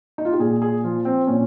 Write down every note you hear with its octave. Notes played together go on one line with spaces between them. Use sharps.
D#4
F4
G4
A#2 G#4
G#4
F3 F4
C4
A#2 C#4